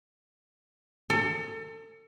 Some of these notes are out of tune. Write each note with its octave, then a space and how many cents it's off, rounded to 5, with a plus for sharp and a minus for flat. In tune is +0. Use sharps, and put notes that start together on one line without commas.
A4 +35